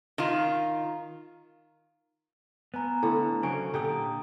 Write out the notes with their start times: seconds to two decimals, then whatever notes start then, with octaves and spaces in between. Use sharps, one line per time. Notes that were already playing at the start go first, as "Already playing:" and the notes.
0.18 D#3 F4
2.74 B3 B4 G#5 A#5
3.03 A2 D3
3.43 C#3 F#3 C4 C#4 D7
3.74 A#2 D3 G4 G5 A#5 D#6